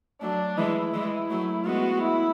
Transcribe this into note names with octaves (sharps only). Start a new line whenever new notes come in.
F#3 A3 D4
E3 G#3 E4
E3 G#3
F#3 A3
G#3 B3 F#4
E4